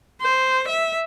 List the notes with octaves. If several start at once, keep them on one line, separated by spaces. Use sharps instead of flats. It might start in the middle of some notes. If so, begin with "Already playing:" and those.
C5
E5